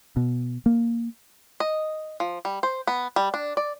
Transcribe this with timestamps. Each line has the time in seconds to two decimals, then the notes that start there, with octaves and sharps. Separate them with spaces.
0.16 B2
0.66 A#3
1.60 D#5
2.20 F3
2.45 G3
2.63 C5
2.87 B3
3.16 G3
3.34 D4
3.57 D5